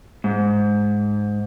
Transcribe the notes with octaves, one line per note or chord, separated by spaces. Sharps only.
G#2